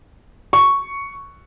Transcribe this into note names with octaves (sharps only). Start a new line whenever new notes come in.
C#6